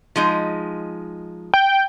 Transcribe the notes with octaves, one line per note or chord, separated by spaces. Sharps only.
F3 G#3 D#4
G5